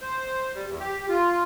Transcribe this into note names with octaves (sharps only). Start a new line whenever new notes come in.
C5
G3
E2
G4
F4